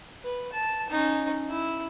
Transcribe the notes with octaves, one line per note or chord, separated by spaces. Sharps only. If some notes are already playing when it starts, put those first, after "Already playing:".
B4
A5
C#4 D#4
E4